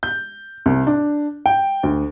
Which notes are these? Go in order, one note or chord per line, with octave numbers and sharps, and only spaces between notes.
G6
C2
D4
G5
D2